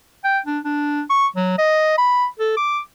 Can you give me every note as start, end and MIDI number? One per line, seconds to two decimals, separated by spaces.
0.24 0.39 79
0.46 0.59 62
0.64 1.01 62
1.10 1.27 85
1.36 1.54 54
1.58 1.94 75
1.98 2.26 83
2.39 2.56 69
2.57 2.79 86